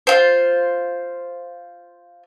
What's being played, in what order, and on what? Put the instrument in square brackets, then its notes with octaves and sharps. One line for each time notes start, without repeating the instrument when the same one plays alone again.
[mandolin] F4 C5